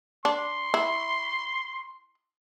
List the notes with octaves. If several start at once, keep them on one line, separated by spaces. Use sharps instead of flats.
D4 C6
E4